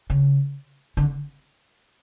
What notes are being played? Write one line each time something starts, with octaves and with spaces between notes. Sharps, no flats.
C#3
D3